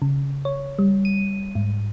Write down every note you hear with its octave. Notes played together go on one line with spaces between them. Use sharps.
C#3
C#5
G3
D#7
G#2